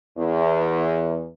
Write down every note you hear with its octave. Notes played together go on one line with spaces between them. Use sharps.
E2